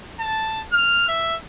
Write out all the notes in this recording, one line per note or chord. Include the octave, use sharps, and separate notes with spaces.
A5
F6
E5